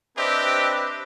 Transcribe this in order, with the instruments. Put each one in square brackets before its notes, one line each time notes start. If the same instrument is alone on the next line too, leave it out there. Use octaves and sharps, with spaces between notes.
[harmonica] C4 B4 [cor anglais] D4 [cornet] G4 [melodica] C5 D#5 E5